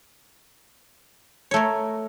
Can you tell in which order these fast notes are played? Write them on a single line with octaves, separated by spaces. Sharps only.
C#5 A3 A#4